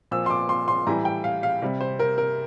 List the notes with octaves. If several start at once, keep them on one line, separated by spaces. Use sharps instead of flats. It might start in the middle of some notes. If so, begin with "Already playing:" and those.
A#2 F3 E6
C6
D6
C6
C6
A2 E3 G3 A#5
G5
F5
F5
C3 G3
C5
A#4
A#4